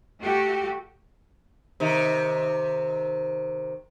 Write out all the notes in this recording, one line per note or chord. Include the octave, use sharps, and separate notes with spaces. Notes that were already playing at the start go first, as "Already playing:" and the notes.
A3 F#4 G4
C3 D#3